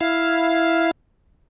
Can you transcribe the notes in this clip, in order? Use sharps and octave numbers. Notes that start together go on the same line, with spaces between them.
E4 F5